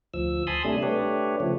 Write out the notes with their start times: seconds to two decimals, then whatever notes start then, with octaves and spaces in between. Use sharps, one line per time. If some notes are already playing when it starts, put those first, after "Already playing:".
0.14 D2 F3 E6
0.47 G#5 A5 B5 C6 D#6
0.65 C3 G3 A3 D4
0.83 A3 D4 G4 B4 C#5
1.40 C#3 F3 A3